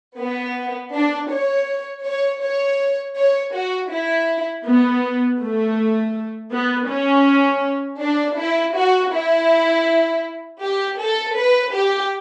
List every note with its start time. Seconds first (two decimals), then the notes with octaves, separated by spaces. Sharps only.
0.18 B3
0.93 D4
1.30 C#5
2.04 C#5
2.42 C#5
3.16 C#5
3.53 F#4
3.90 E4
4.65 B3
5.40 A3
6.52 B3
6.89 C#4
8.01 D4
8.38 E4
8.76 F#4
9.13 E4
10.62 G4
10.99 A4
11.36 B4
11.73 G4